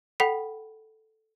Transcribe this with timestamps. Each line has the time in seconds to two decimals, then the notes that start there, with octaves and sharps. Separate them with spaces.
0.20 A4 F#5 G5 B5 B6 F7